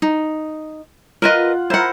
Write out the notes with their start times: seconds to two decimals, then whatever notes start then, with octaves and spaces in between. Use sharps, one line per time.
0.02 D#4
1.22 F4 A#4 B4 D#5 F#5
1.70 E4 A#4 C5 F#5 A#5